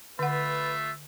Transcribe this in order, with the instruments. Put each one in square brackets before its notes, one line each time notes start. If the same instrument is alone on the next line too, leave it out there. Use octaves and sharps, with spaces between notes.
[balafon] D3 F#5 [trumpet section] A3 F4 E5 [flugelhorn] B4